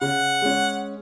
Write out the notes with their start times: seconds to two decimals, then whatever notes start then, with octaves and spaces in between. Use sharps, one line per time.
0.01 C#3 F#5
0.42 G#3 C#4